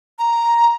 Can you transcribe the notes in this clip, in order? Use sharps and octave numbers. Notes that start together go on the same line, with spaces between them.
A#5